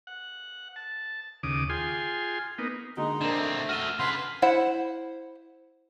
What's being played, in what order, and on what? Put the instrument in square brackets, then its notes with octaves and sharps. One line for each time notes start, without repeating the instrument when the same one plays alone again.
[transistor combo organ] F#5
A5
D#2 C#3 D6 D#6
F4 G#4 G5 G#5 C6
A#3 B3 D#4
[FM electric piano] D3 A#3 F#4 [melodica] G#3 D#4
[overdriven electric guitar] D3 C4 [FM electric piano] D4 A#4 [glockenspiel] E7
[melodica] A3
[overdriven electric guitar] F#4 E5 [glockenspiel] F6 D#7 G7
[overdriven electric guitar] C#3 B4 [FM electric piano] F#5 A5 G#6 [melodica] C6
[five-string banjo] E4 C5 F#5